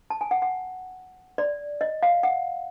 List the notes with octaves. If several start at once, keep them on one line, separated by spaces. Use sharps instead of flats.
A5
G#5
F#5
F#5
D5
D#5
F5
F#5